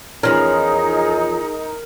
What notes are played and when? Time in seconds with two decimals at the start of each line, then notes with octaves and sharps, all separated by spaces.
0.23 E2 F3 C#4 D#4 G#4 A#4